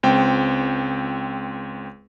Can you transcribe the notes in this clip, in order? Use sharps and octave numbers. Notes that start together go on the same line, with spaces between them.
C#2 C4 G5